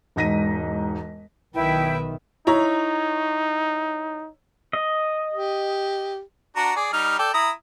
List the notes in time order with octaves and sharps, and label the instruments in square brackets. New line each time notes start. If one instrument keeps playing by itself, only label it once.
[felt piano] E1 G#2 D#4 A#6 B6 D#7
[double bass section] B1 D#3 [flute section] E4 G5 [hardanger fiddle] B4 E5
[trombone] D#4 [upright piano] E4 C#5 A#5
[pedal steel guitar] D#5
[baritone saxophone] G4
[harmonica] D4 F#4 A#5
G#4 D5
G3 D#4 F6
A4 D5 G5
E4 A#5 D#6